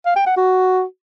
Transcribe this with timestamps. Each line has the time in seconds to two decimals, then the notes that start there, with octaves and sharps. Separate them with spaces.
0.06 F5
0.16 G5
0.26 F#5
0.37 F#4